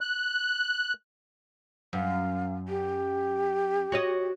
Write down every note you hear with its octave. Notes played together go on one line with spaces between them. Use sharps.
F#6
F#2 F5
G4
F#4 C#5 D#5